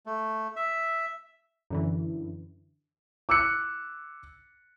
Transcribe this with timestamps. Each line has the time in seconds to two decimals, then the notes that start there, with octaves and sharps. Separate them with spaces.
0.06 A3
0.56 E5
1.70 F#2 D3 E3
3.29 D6 E6 F#6 C#7